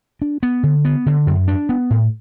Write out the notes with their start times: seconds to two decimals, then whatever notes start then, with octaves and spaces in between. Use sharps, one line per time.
0.22 D4
0.43 B3
0.63 D3
0.85 B3
1.06 D3
1.26 F#2
1.48 D4
1.69 B3
1.90 A2